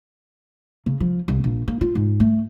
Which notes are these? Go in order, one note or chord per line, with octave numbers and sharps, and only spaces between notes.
C#3
F3
C2
A#1
A#3
F4
G#2
A3